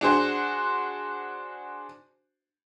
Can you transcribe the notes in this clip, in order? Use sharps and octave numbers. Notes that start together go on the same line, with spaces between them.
D4 F#4 G#4 C5